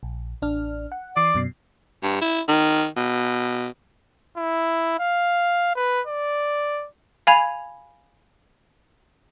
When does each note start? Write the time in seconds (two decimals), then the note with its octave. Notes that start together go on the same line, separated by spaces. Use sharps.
0.03 A#1
0.42 A1 D4 F6
0.92 F#5
1.17 E3 D5 D#6 C7
1.34 F#2 B2 C7
2.03 G2
2.21 E4
2.48 D#3
2.97 B2
4.37 E4
4.99 F5
5.76 B4
6.07 D5
7.27 F5 G#5 B5 G#6 F7